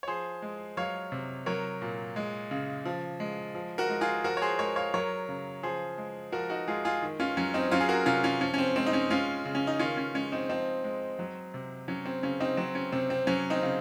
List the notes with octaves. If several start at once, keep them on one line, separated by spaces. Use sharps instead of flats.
C#5
F3 G#4 C5
G#3
F#3 C#5 F5
C3
F#3 A#4 C#5
A#2
G#3
C#3
F3
G#3
F3
F#4 A#4
G#3
F4 G#4
F3 F#4 A#4
C#5
G#4 C5
G#3 A#4 C#5
C#5 F5
F#3 A#4 C#5
C#3
F3 G#4 C5
G#3
F3 F#4 A#4
D#4 F#4
G#3 F4 G#4
F4 G#4
D#3
C#4 F4
F#3 C#4
C4 D#4
F#3 C#4 F4
G#4
F#4 A#4
C3 C#4 F4
C#4 F4
F3 C#4
C#4
C4
G#3 C4
D#4
C#4
G#3 C#4 F4
C#3
C#4
D#4
D#3 C#4 F4
C#4
G#3 C#4
C4 D#4
F3 C4 D#4
G#3
F#3
C3
F#3 C#4
C4
C#3 C#4
C4 D#4
F#3 C4
C#4
C3 C4
C4
F#3 C#4
C4 D#4
C#3